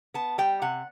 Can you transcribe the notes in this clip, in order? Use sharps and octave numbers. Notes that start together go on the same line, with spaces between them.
B3 A5
G3 G5
C3 F#5